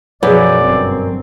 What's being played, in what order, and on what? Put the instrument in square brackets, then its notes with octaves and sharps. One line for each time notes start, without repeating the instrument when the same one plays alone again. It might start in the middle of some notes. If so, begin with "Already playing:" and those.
[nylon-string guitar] F#2 [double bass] B2 F3 [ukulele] G#4 B4 [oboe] D5
[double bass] G1 C4